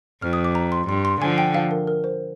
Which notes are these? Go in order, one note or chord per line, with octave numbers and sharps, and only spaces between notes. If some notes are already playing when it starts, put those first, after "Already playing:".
F2 F6
D#6
D6
A#5
C6
G2 C6
C6
D3 F3 G#5
G5
F5
A#4
A#4
C5